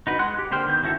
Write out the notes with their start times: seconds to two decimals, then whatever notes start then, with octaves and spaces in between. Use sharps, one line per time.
0.07 D#4 F#4 B4
0.19 G#3 F#5 C6 F#6
0.39 G4
0.51 D3 A#3 C5 G5 F6
0.66 D#3 B3 G6
0.82 D#3 C#4 E4 F#4 A4